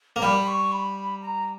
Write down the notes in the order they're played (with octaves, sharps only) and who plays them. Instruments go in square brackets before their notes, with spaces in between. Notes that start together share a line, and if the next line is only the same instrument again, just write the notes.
[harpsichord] A#3
[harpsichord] G3 [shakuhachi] B5
[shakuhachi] C#6
B5
A#5